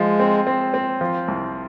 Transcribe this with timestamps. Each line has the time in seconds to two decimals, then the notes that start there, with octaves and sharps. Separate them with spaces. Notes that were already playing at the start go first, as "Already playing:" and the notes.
Already playing: F3 G#3
0.19 C4
0.47 C4
0.74 C4
1.01 F3
1.28 C2